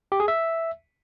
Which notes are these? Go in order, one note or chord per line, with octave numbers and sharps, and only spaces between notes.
G4
G#4
E5